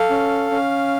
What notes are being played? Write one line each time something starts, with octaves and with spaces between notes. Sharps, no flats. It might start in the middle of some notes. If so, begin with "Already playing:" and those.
Already playing: A4 F5
C#4
C#4